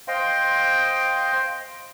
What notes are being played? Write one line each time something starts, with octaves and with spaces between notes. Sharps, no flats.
C5 D#5 F5 G5 C6